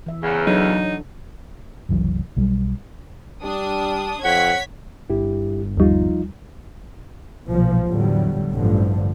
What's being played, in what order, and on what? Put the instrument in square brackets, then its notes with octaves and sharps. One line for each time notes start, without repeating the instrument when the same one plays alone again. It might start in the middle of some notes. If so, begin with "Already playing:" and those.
[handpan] E3 E5
[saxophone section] E2 C#3
[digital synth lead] F#3 [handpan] D4 A4 [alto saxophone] D#4
[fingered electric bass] F#1 C2 E3 F#3
B1 F#3 G3
[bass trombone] G3 [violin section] D4 D#6
[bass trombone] F2 [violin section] C#5 G#6 B6 [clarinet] F#5
[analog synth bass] G1 [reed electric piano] E4 G4
[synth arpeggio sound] D#2 G3 [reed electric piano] F3 D#4 F4
[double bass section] B1 A#2 F3
E2 A2 D3 F#3 G3
A1 G2 D3 F3